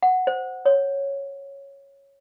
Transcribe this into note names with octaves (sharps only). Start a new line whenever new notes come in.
F#5
C5
C#5